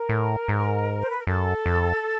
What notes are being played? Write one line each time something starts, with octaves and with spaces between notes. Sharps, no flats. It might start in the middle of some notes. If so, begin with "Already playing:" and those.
Already playing: A#4
A2
G#2
C5
B4
A#4
F#2 A4
F2